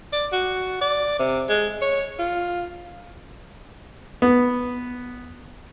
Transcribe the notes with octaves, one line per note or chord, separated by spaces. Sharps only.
D5
F#4
D5
C3
G#3
C#5
F4
B3